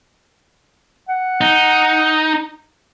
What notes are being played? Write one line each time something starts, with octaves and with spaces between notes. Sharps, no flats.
F#5
D#4